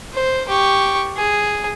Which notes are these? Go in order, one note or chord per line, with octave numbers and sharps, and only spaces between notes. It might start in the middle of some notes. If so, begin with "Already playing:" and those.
C5
G4 C#6
G#4